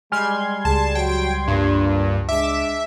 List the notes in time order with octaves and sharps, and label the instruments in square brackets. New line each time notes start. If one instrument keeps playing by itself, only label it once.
[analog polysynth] G3 C6 G#6 [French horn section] G#3 [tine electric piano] G#5 F6
[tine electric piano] C#2 [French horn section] G#4 [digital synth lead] A5
[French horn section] F#3 [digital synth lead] G5
[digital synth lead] G2 [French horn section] A#2 D5
[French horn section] G#3 D4 [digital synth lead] E5 [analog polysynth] D6 E7